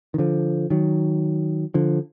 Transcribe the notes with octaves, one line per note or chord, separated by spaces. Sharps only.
D#3
D3 F3
D#3 F#3
D3 F3